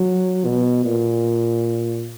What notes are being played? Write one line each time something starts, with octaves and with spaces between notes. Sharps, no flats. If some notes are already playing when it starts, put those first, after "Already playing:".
Already playing: F#3
B2
A#2